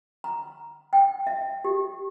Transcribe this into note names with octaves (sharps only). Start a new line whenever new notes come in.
A#5
G5
E5
G4